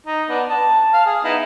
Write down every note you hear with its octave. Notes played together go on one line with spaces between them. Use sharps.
D#4
B3 D4
A5
F5
G#4
B3 D#4 E4